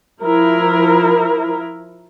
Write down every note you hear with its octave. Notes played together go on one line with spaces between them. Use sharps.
F3 E4 A#4